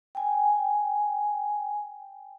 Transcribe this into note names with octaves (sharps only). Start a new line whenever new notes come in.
G5 G#5